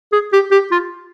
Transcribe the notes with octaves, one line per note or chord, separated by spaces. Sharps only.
G#4
G4
G4
F4